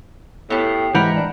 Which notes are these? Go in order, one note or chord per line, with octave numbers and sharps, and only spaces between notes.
A2 B3 G4
G#2 E3 G4 A#4 F#5 B5
D4